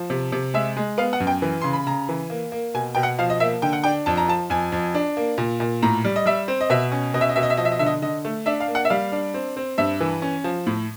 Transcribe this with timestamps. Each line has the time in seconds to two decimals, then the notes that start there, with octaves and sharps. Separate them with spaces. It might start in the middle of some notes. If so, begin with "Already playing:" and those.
Already playing: F3
0.10 C3
0.32 C3
0.54 G#3 E5
0.77 G#3
0.98 B3 F5
1.13 F#5
1.20 F#2
1.27 G5
1.42 E3
1.62 C#3 C6
1.73 B5
1.87 C#3 A#5
2.09 E3
2.30 A#3
2.52 A#3
2.74 B2 G#5
2.95 B2 G5
3.03 F#5
3.19 F3 F5
3.30 D#5
3.40 A#3 E5
3.62 D3 G5
3.73 F#5
3.84 D4 G5
4.06 F2 A5
4.17 A#5
4.28 F3 A5
4.50 F2 G#5
4.72 F2
4.95 D4
5.17 A#3
5.38 A#2
5.60 A#2
5.82 A2 A#5
6.05 G3
6.16 D#5
6.26 G3 E5
6.48 C4
6.61 D#5
6.70 B2 E5
6.92 C#4
7.14 B2 D#5
7.21 E5
7.29 D#5
7.36 B2 E5
7.43 D#5
7.50 E5
7.57 F3 D#5
7.65 E5
7.72 D#5
7.79 D3 E5
7.86 D#5
8.02 D3 D#5
8.25 A3
8.46 D4 E5
8.60 F5
8.68 A#3
8.75 F#5
8.85 E5
8.90 G3 F5
9.12 D4
9.34 C4
9.57 C4
9.78 G2 E5
10.01 E3
10.22 C#4
10.44 F3
10.66 A2